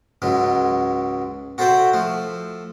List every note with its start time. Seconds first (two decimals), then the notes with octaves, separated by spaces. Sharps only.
0.22 C#2 G#2 F#3 G#3
1.58 F#4 A4 C5 E5 F#5 G5
1.93 F3 A3